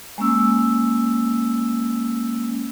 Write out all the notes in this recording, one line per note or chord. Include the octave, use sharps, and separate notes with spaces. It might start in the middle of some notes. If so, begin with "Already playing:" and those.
G#3 A#3 C#4 E6